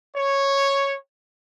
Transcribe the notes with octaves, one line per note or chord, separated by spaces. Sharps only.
C#5